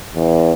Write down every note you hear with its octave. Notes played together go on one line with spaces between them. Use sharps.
E2